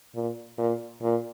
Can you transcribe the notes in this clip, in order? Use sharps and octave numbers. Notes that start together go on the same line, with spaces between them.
A#2
A#2
A#2